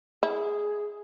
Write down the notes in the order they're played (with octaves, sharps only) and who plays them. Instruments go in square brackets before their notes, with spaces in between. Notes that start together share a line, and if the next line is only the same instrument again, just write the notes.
[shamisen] E4 [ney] G#4